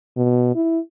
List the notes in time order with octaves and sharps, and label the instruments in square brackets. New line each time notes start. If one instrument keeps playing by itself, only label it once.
[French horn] B2
E4